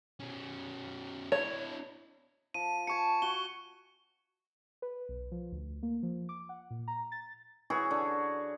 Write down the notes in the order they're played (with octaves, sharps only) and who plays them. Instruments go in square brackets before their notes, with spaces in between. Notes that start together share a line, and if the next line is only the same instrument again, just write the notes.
[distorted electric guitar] B2 C#4
[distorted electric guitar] D4 E4 [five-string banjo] C#5
[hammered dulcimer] F3 [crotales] D#7
[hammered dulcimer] G#5 A5 [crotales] C#6 C#7
[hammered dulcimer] F#4 [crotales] G7
[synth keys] B4
B1
F3
D2
A#3
F3
D6
F#5
A#2
A#5
A6
[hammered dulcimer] E3 F#4 G#4 C#5
D3